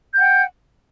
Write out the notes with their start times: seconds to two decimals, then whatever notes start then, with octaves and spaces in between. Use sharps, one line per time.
0.14 G6
0.17 F#5
0.20 G5